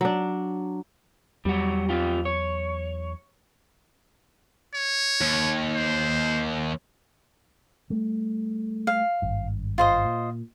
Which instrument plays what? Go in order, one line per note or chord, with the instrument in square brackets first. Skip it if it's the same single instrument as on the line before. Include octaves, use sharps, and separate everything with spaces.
[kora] F#3 D4
[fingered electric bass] E2 F#3 [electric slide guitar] G3 F#4
[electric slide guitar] C4 F4 G4
C#5
[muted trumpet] C#5
[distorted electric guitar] D#2
[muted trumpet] C5
[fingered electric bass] G3 A3
[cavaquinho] F5
[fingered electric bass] G#1 G2
[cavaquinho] F4 C5 D#5
[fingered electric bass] A#2